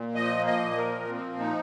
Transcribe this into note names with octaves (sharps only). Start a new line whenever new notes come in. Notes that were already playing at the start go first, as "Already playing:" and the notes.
Already playing: A#2
F3 D#5
A#3
D#5
A#2
A#4
F3
F3 C4
A#2
D#4